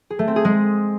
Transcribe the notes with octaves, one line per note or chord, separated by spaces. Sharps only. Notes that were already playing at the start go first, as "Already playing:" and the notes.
G#4
A3
C4
G#4
G#3